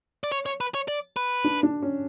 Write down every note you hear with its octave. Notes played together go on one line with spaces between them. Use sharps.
D5
C#5
C#5
B4
C#5
D5
B4
D4
D4
C#4